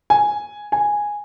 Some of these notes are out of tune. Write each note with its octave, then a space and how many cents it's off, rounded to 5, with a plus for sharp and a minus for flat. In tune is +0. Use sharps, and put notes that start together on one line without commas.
G#5 +0
G#5 -5